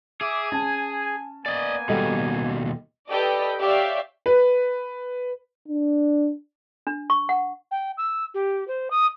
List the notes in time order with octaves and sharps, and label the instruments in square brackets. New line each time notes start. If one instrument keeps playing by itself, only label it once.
[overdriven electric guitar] G#4 [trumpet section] E5 D6
[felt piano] C#4 A5 [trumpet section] G#5
[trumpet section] A#3 B3 G#5 [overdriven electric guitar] D5 D#5
[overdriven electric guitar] D#2 B2 [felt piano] G3 A4 D#5
[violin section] G4 A4 B4 D5 D#5 G5
G4 C#5 D5 E5 F5
[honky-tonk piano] B4
[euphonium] D4
[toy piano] D4
C#6
F#5
[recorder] G5
E6
G4
C5
D#6